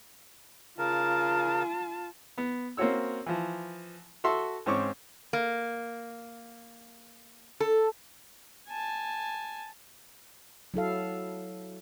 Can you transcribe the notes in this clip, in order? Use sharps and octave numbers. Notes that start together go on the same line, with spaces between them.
C#3 F4 A#4 A5
B3
A#3 C4 C#4 F#4 C#5 E6
E3 F3
F#4 A4 E5 C6 C#6
G#2 C4 C#4 C#6 D6
A#3
A4
G#5 A5
F#3 E4 A4 F5